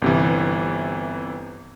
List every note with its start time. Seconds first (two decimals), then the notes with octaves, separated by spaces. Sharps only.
0.02 G1 C3 E3